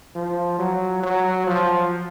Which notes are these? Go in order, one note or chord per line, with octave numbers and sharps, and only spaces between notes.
F3
F#3
F#3
F3